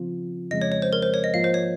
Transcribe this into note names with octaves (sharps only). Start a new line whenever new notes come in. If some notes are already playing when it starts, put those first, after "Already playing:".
Already playing: C#3 F3 C4 F4
F2 C#3 F3 G#3 C4 D#5
C#5
C#5
C5
A#4
C5
C#5
D#5
G#2 F3 A#3 F4 F5
C5
C#5